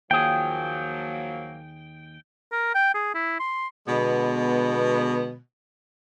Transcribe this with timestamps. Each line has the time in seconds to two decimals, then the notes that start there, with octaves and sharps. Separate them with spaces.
0.11 D#2 F3 F#3 A#3 G#4 G5
2.52 A#4
2.75 G5
2.94 G#4
3.15 E4
3.39 C6
3.88 B2 D3 G#3 B3